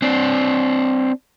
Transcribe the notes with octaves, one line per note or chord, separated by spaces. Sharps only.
C4 D4